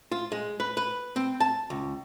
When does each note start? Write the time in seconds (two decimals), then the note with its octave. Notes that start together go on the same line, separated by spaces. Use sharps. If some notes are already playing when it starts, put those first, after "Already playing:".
0.12 F4
0.32 G#3
0.60 B4
0.77 B4
1.16 C4
1.40 A5
1.70 C#2